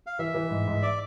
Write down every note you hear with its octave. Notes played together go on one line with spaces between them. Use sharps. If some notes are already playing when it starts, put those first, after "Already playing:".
F5
E3 E5
E3
G#2
G#2
D5